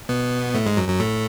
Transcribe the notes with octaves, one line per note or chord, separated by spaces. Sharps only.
B2 B3
A2 A3
G#2 G#3
F#2 F#3
F#2 F#3
A2 A3